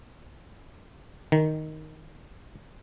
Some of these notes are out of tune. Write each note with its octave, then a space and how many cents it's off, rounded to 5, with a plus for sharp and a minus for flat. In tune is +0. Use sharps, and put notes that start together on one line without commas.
D#3 +0